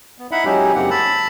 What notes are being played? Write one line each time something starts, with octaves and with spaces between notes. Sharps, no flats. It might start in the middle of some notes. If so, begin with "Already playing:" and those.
B3
D#4 E4 E5 F#5 B5
F#3 G#3 C#4 D#4 E4 G4
F#2 C#3 A#3 C4 G4 F#5
A5 B5 E6